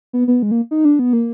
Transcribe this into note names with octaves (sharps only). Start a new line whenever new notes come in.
B3
B3
G#3
A#3
D#4
D4
B3
A#3